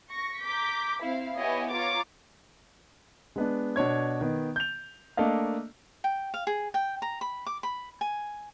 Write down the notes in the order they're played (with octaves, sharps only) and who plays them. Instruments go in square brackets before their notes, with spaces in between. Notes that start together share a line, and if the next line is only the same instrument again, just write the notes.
[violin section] C#6 A#6
A#5 D6 G6 B6
C4 E4 F5
B3 E4 G4 C#5 D#5 G#5
F4 C#5 A#5 D6 A6
[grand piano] G#3 B3 D4
B2 D4 C#5 G#6
D#3 B3
G6 F7
A3 A#3 D4 D#5 F5
[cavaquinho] G5
F5
G#4
G5
A#5
B5
D6
B5
G#5